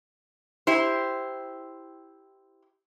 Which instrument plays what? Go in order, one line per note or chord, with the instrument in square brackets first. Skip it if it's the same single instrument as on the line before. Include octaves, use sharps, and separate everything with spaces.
[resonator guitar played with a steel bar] E4 G4 C5